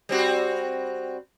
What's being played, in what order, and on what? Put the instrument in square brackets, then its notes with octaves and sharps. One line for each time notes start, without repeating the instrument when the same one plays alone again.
[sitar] G3 C4 F#4